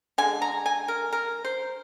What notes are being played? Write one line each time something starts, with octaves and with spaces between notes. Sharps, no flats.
D3 G#3 G#5
A#5
G#5
A#4
A#4
C5